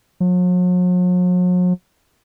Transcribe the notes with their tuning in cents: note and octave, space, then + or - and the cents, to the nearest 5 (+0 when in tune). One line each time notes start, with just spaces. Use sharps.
F#3 -45